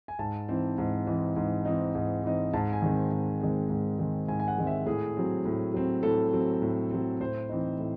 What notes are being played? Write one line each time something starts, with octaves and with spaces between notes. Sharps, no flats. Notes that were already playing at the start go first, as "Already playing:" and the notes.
G#5
G#2 A5
E3 C4 D#4
G#2
E3 C4 D#4
G#2
E3 C4 D#4
G#2
E3 C4 D#4
G#2 A5
G#5
D#3 G#3 C4
G#2
D#3 G#3 C4
G#2
D#3 G#3 C4
G#2 G#5
G#5
F#5
D#3 G#3 C4
E5
A2 G#4
F#3 C4
A2
F#3 C4
A2 A4
F#3 C4
A2
F#3 C4
A2 C5
E3 C4 D#4
A2